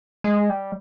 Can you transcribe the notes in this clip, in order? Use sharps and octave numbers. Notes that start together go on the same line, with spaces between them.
G#3
G3